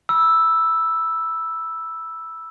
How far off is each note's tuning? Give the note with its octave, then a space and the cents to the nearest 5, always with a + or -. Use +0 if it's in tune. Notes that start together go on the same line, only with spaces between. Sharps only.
B5 -25 E6 +0